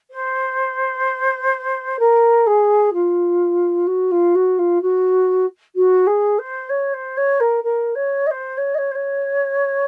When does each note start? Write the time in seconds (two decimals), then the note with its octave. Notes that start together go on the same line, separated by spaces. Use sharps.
0.10 C5
1.99 A#4
2.46 G#4
2.93 F4
3.86 F#4
4.11 F4
4.35 F#4
4.58 F4
4.81 F#4
5.75 F#4
6.06 G#4
6.38 C5
6.69 C#5
6.93 C5
7.17 C#5
7.40 A#4
7.63 A#4
7.95 C#5
8.26 D#5
8.30 C5
8.57 C#5
8.74 D#5
8.78 C#5
8.91 C5
8.95 C#5